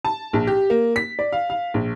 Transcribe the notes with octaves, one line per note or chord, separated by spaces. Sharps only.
A5
A#1
G4
A#3
B6
D5
F5
F5
A#1